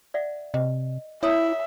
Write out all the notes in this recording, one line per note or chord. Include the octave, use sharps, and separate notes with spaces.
D5 E5 F#5
C3 D#5
E4 C#5 E5 D#6